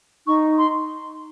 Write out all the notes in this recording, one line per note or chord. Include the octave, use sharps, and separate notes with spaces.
D#4 C#6
C6